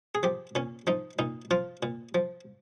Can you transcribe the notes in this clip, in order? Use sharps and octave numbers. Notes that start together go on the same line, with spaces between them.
G#4
F3 G4
A#2 C#4
F3 D#4
A#2 D#4
F3 F4
A#2
F3